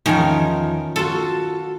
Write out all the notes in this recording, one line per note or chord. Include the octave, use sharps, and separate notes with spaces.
E2 D#3 F3 C#4 G#5
F4 F#4 A4